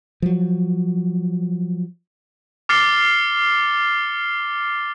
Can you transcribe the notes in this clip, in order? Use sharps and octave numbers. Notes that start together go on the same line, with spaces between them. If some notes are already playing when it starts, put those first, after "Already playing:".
F3 F#3
D6 F6 A6 C7 C#7 G7